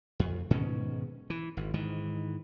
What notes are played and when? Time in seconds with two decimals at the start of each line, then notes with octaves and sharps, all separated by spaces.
0.20 F2
0.51 G#2 B2 D#3 C#4
1.30 E3
1.57 G#1
1.74 G#2 D#3 E3